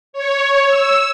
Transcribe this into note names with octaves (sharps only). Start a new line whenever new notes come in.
C#5
E6